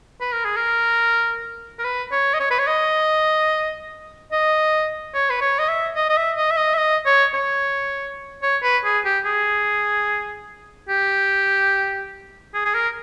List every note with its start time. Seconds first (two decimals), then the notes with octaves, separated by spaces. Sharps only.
0.21 B4
0.33 A#4
0.45 G#4
0.57 A#4
1.79 A#4
1.84 B4
2.12 C#5
2.34 D#5
2.40 C#5
2.51 B4
2.59 C#5
2.67 D#5
4.32 D#5
5.14 C#5
5.30 B4
5.41 C#5
5.59 D#5
5.69 E5
5.96 D#5
6.09 D#5
6.17 E5
6.37 D#5
6.51 E5
6.57 D#5
6.74 E5
6.78 D#5
7.06 C#5
7.34 C#5
8.43 C#5
8.63 B4
8.85 G#4
9.05 G4
9.25 G#4
10.89 G4
12.54 G#4
12.65 G#4
12.74 A#4